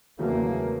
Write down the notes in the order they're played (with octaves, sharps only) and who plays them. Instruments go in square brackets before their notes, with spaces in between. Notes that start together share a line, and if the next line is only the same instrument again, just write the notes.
[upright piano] E2 C#3 F#3 A3 [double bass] A#3